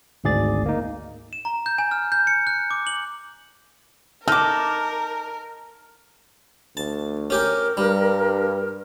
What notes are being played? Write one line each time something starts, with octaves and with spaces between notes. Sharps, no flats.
G#1 D2 G#2 G#4 D5 A6
A#3 D#4
E7
A#5
G6
G#5
F6
G6
C#7
F#6
D6
F#7
D#4 A4 A#4 D6 F6
D2 A5
C#4 G4 A#4 G5
G2 G3